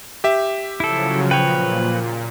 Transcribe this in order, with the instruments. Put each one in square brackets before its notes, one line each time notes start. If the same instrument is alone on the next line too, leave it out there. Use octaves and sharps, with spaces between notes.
[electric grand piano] G4 E5
[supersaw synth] C#3 F3 F#3 [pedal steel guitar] E4 A4
[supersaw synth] A#2 [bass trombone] F3 [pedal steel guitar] B4 C#5 [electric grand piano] G5